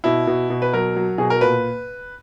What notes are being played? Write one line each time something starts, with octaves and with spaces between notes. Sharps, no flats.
B2 E4
B2
B2
B4
F#3 A#4
F#3
B2 G#4
A#4
A#2 B4